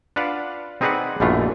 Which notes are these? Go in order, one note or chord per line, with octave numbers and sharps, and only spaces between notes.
D4 F4 B4 D5 F5 F#5
C4 D#4 G#4 B4 D5 F#5
A#1 F#2 B2 E3 A3 F4